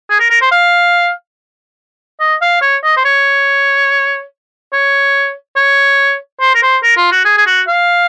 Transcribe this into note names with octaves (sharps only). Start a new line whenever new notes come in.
G#4
A#4
A#4
C5
F5
D#5
F5
C#5
D#5
C5
C#5
C#5
C#5
C5
A#4
C5
A#4
F4
F#4
G#4
G#4
F#4
F5